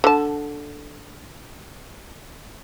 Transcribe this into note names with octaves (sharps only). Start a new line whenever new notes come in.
D3 A5